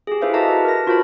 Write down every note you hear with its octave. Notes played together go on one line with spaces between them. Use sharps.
G4 G#4
E4 A4 B4 C5 E5 F5
F#4 G4 D#5 E5 A5 A#5
B4 A5
A#4 B4 A#6
F4 F#4 A#4 C5 A5 B5